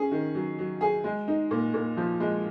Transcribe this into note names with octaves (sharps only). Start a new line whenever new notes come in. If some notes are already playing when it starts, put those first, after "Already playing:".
Already playing: C#4 G#4
D#3
F#3
F#3
G#4
G#3
D#4
A#2
A#2
F3
G#3